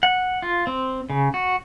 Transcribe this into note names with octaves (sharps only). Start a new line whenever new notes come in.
F#5
F4
C4
C#3
F#4